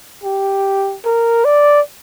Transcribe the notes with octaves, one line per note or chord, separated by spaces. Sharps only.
G4
A#4
D5